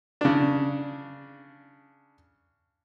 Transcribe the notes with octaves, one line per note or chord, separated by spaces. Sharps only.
C#3 D4